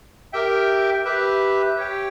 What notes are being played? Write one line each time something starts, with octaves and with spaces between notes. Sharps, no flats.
G4 A#4 E5 G5
G4 B4 E5
G4 C#5 G5